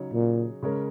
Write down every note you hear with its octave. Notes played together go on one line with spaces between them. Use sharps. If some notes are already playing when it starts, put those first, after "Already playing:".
Already playing: C#3 F#3 D#4 G#4 C#5
A#2
C#3 G#3 C#4 A#4 C#5